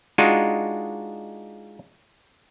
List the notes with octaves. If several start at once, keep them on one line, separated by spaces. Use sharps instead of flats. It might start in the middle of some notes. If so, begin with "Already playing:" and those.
G#3 D4 D#4 F4 F#4